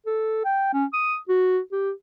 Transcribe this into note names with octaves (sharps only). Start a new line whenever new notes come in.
A4
G5
C#4
D#6
F#4
G4